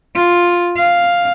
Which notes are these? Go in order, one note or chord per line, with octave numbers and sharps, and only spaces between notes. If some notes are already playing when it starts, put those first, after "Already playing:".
F4
F5